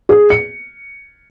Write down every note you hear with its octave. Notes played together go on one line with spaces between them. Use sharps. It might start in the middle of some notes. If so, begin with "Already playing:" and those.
G#4
C#7